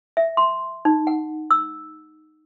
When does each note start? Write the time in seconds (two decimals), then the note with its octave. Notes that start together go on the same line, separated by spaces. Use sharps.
0.17 E5
0.37 C6
0.85 D#4
1.07 F#5
1.51 E6